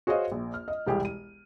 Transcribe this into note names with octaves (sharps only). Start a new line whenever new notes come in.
F#4 G#4 C5 C#5 D#5 F5
A#1
F6
D#5
E1 C2 G4 G#4
D#7